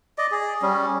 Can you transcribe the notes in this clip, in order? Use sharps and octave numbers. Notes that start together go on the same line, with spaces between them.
D5 D#5
G#4
G3 C#4